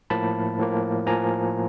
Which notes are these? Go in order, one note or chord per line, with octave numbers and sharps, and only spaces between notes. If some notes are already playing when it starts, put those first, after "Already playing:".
A2 F3 A#3 A5 B5
A2 F3 A#3
A2 F3 A#3 G#5 A#5